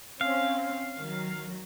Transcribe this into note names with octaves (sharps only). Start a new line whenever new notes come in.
C4 C#4 F5
D#3 F#3